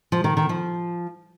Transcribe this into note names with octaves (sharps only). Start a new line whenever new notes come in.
F3
D#3
D#3
F3